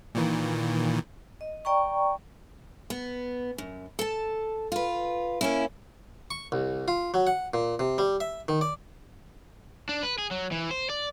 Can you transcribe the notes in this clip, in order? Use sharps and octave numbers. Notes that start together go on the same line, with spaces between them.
A#2 D#3 E3
D#5
D5 G5 A#5 C#6
B3
F#2
A4 A5
F4 B4
A#3 C#4 E4
C#6
C2
F4
F#3
F#5
A#2
C3
G3
E5
D#3
D5
D4
B4
G#4
F#3
E3
C5
D5